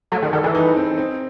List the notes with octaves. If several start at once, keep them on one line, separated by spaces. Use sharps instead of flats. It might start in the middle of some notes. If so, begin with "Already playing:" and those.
F#3 A3
D#3 G#4
D#3 A4
E3 G#4
D#4
C4
C4